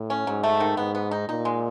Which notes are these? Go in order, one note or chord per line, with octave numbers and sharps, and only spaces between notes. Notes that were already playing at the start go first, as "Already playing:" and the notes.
Already playing: A2
C#4
G#2 F#3
A3
D#3
G#2 B3
B3
D#4
A#2 D#4
G#3